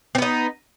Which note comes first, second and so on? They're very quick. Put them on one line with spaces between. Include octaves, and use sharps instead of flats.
C4 B3 D#4